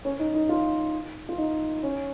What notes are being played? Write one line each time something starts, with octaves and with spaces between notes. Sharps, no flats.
C#4
D#4
D#4
F4
F4
D#4
C#4